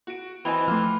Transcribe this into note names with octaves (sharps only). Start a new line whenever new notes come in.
F#4 D7
E3 C4 D#5 G5 G#5 B5
F3 A3 C6 D6 F6